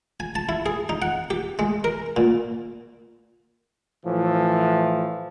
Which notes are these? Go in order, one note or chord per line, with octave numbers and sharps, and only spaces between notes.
G#5
A5
E4
G#4
D#4
F#5
G4
G#3
A#4
A#2
A2 E3 F3